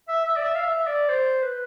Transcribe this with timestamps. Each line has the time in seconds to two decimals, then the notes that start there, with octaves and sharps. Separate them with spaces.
0.08 E5
0.25 E5
0.36 D5
0.42 E5
0.55 F5
0.64 E5
0.87 D5
1.09 C5
1.42 B4